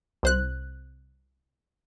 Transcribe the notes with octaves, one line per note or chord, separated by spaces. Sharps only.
C2 C5 F#6